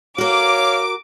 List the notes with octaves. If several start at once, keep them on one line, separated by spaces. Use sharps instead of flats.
F#4 A#4 C#5 F5 D6